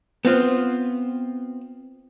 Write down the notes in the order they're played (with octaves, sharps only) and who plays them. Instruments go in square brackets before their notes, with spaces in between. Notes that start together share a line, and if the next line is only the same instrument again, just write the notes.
[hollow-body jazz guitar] B3 C4 F4